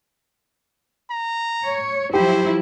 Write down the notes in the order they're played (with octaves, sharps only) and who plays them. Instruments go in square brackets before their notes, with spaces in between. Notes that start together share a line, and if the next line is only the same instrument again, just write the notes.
[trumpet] A#5
[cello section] C#5
[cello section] F3 F#3 E4 [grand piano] G4 [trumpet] C5